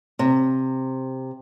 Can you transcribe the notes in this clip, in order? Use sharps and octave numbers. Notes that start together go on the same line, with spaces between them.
C3